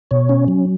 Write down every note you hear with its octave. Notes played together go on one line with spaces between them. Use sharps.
B2 C#5
C#4
F#3